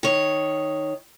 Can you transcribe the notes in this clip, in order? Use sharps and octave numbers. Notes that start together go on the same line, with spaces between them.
D#3 C#5